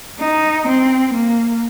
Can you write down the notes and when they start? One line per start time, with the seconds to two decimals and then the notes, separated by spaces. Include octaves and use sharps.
0.20 D#4
0.68 C4
1.14 A#3